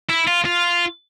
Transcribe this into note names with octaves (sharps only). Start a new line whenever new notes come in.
E4
F4
F4